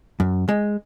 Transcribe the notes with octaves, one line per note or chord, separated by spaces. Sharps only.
F#2
G#3